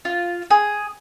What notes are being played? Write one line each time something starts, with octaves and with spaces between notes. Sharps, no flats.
F4
G#4